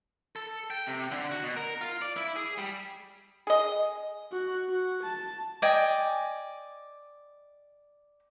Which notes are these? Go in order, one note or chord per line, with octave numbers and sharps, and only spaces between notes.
A4
G5
C3
D3
F#4
B2
A#4
F4
D5
E4
G#4
G3
G#4 D#5
F#4
F#4
A5
D5 D#5 G5 G#5